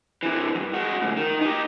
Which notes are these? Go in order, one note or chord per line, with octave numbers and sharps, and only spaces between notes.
C3 E3
E2 G2
G#3 F#4
D2 G#2
D#3
D#4 G4